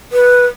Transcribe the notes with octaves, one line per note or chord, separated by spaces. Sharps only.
B4